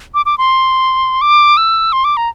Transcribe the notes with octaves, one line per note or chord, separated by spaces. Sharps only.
D6
D6
C6
D6
E6
C6
D6
A#5